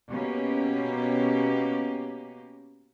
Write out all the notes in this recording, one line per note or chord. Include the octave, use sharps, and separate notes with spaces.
B2 A#3 C#4 G4